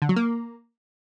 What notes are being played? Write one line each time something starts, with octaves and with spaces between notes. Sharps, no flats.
D3
F#3
A#3